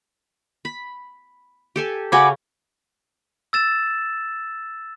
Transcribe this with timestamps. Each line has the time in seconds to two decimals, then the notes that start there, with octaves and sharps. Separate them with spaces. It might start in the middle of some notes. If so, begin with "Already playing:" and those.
0.65 B5
1.76 G4 A4 G#5
2.12 C#3 C#4 F#4 G#5 B5 D6
3.53 E6 A6 E7